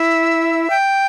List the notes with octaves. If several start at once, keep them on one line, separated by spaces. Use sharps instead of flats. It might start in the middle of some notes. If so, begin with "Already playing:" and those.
Already playing: E4 E5
G5